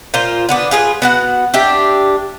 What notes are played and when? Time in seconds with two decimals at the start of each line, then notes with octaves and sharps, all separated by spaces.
0.14 A#2 F4 C5
0.49 D3 B3 D4
0.71 F4 G#4 A#4 B4
1.02 B3 F#4 F#5
1.54 D4 G4 E5